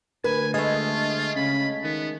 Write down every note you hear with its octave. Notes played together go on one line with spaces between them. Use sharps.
D2 A#4 B4 G#5
G#3 A3 F4 D#5 G#6
D2
C#3 B5
D#3 B3